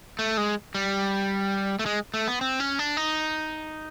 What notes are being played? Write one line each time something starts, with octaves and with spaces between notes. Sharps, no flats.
A3
G#3
G3
A3
G#3
A3
B3
C4
C#4
D4
D#4